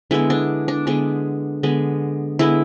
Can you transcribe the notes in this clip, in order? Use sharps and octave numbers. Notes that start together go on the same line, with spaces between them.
D3 G#3 B3 E4
D4
D4
D3 G#3 B3 D4
D3 G#3 B3
D3 G#3 B3 E4